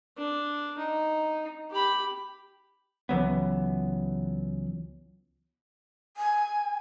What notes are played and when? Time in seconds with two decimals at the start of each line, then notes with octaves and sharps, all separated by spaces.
0.18 D4
0.78 D#4
1.71 G4 B5
3.09 C#2 E3 F#3 B3
6.17 G#5